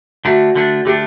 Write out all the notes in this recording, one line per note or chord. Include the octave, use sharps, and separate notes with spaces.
D3 A3 D4 F#4
D3 A3 D4
D3 A3 D4 G4